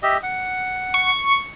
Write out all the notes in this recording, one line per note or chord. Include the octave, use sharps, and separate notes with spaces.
G4 D#5 E5
F#5
C#6